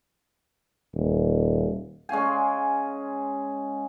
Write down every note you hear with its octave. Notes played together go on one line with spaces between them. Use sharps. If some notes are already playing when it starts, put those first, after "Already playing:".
D#1
G#3 C#4 F5 G#5